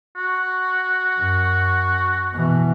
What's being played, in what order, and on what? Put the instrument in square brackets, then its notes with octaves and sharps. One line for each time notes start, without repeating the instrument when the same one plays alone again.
[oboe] F#4
[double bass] F#2
B2 E3